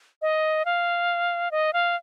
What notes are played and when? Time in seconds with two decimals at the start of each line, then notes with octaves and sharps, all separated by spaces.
0.22 D#5
0.65 F5
1.51 D#5
1.73 F5